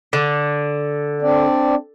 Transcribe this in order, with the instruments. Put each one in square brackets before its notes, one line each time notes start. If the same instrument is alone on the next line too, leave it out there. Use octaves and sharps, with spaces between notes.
[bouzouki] D3
[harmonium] C4 D4 D5